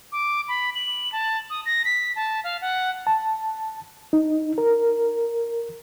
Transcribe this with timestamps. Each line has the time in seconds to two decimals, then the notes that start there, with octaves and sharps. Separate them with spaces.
0.12 D6
0.48 B5
0.75 F#7
1.12 A5
1.50 D#6
1.66 A#6
1.85 B6
2.16 A5
2.44 F5
2.61 F#5
3.07 A5
4.13 D#4
4.58 A#4